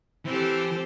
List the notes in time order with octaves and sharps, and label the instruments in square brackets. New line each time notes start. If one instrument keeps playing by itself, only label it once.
[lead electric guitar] E3 [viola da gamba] C4 G4 A4